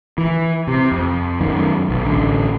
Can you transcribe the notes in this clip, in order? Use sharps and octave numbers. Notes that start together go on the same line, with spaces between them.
E3
C3
F2
F#2 D#3
B1
A1 D3